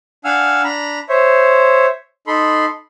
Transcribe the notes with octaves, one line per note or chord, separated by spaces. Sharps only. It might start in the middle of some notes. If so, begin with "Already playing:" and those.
D4 F5 F#5 G#5 E6 F6
D4 A#5 B5
C5 C#5 E5
D#4 A4 B5 C6